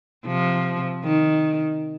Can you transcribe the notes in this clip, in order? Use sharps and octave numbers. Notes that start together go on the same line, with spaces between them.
C3 F3
D#3